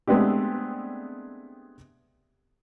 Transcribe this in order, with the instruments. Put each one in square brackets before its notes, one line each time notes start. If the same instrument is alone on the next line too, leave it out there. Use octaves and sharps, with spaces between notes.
[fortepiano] G#3 A3 B3 C4 D4 G4